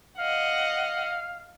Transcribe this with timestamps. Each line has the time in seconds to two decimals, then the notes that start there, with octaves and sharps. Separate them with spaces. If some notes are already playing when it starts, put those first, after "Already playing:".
0.19 D#5 F5 F#5